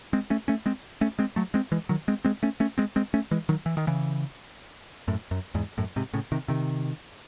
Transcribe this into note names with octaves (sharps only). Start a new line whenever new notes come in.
G#3 C4
A3 C#4
A3 C#4
G#3 C4
A3 C#4
G#3 C4
F#3 A3
G#3 C4
E3 G#3
D#3 F#3
G#3 C4
G#3 C4
A3 C#4
A3 C#4
G#3 C4
G#3 C4
A3 C#4
E3 G#3
D#3 F#3
E3
D#3
C#3 E3
F#2 A2
F#2
E2 G#2
F#2 A2
G#2 C3
A2 C#3
C3 D#3
C3 D#3